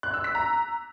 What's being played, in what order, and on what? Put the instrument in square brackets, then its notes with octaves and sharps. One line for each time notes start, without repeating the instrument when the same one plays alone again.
[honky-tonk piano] F#6
E6
B6
A#5